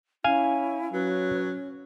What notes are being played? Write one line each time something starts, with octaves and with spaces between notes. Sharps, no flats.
C#4 E4 F5 G#5
F#3 C#4 B4